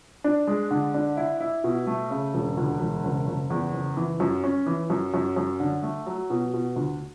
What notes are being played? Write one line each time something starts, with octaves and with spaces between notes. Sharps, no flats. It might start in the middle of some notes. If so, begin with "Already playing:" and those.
D4
G#3
D3
D4
E4
E4
B2
A3
C#3
E1
D2
E1
F#1
F#1
E2
F#1
E3
F#2
C#4
E3
F#2
F#2
F#2
D3
A3
F#3
B2
B2
D2